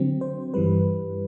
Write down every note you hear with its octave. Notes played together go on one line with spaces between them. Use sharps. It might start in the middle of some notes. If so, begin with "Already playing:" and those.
Already playing: D3 F#3 C4
C5
G2 E3 G3 B4